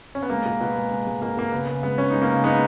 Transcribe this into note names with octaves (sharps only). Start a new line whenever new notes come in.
C#4
B3
G#3 A#3
B2
B2 B3
G#3
G#3
G#3
B2 A#3
B2 A#3
C#3 B3
C#3
G#3 B3
G#3 C#4
G#3 D#4
A#3 C#4
C#3
G#3 B3 D#4